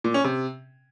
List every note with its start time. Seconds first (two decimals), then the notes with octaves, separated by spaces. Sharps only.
0.04 A#2
0.14 C#4
0.24 C3